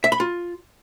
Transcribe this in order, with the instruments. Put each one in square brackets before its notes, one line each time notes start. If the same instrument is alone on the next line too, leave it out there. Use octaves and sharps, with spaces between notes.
[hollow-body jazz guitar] E5
B5
F4